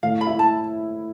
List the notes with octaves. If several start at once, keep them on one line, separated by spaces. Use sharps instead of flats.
A2 F5
B5
E4
A5